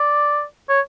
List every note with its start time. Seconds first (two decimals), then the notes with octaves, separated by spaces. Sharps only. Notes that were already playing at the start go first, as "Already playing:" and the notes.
Already playing: D5
0.69 C#5